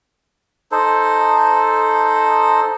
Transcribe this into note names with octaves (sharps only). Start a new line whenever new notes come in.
D#4 A4 C5